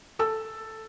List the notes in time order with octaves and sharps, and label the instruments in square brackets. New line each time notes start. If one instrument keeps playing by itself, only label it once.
[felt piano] A4 E6